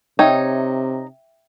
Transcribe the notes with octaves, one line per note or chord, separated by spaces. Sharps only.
C3 D#4 C#5 E5 G5